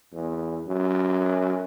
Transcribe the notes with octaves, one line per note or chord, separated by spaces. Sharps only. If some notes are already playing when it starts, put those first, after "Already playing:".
E2
F#2